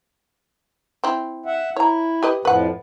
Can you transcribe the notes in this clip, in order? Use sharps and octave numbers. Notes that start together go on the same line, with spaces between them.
C4 E4
E5 F#5
E4 C#5 A#5
G4 B4 D#5
F2 A2 F3 B4 F#5